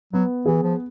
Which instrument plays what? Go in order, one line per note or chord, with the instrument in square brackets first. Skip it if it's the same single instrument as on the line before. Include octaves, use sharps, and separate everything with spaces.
[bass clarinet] F#3 [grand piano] B3
[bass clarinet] E3 [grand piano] G#4
[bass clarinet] F3